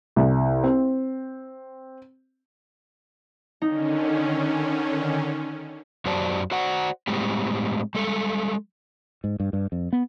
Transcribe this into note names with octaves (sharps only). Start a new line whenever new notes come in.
C2
C4
D3 D#3 C#4 D#4
F#2 F#3 G4 C5 D5 A5
F#4 C5 D5 F#5
A2 G3 G#3 C4 G4
G3 G#3 A4
G#2
G2
G2
F2
B3